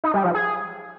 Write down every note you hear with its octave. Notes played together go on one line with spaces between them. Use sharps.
D#4
G3
F3
G#4